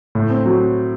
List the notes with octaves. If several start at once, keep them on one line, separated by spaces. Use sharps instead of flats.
A2
C4
F#3